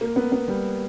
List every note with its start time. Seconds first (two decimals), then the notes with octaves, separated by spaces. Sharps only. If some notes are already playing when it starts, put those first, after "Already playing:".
0.01 A#3
0.16 B3
0.32 B3
0.48 G3